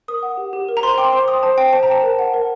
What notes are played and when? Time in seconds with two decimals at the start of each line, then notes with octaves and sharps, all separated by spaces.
0.08 A#4 D#6
0.23 F#5
0.37 G4
0.53 G4
0.69 A#4
0.77 A#5
0.83 C5 C6
0.98 G5 D6
1.12 C5 C6
1.28 G5 D#6
1.43 C5 A5
1.58 G5
1.73 C5 A5
1.83 A#5
1.88 G5 A5
2.03 A#4
2.19 F#5
2.34 A#4